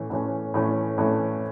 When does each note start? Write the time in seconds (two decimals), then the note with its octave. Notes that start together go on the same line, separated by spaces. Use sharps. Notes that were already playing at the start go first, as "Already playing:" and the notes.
Already playing: A2 E3 A3 C#4
0.10 A2 E3 A3 C#4
0.54 A2 E3 A3 C#4
0.98 A2 E3 A3 C#4